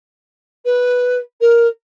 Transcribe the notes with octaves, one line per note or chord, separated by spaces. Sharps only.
B4
A#4